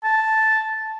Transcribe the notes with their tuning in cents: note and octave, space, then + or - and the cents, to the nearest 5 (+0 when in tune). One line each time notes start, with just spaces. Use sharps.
A5 -5